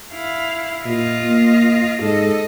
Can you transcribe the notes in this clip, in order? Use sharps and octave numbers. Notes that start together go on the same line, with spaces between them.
E4 F5
A#2 F4 D#5
A#3
G#2 A4 D#5